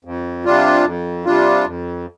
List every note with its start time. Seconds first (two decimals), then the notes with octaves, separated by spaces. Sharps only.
0.05 F2
0.45 C3 G3 D4 F4
0.85 F2
1.25 C3 G3 D4 F4
1.66 F2